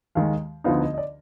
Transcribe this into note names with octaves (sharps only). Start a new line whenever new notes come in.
D#2 D#3 G#3 F5
D2 D3 F3 B3 D#4 F5
D#5
D#5
D5